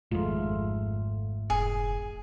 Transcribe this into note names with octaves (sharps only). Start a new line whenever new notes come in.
G#1 F2 G#2 A3 F4
F1 G#4